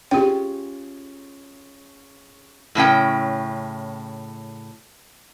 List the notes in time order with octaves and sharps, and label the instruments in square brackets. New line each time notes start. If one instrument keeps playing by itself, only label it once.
[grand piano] C#4 F4 G#4 [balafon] G4 G5
[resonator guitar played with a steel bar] A2 C#3 C#4 G5